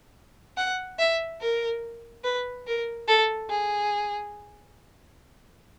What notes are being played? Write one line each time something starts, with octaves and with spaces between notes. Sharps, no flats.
F#5
E5
A#4
B4
A#4
A4
G#4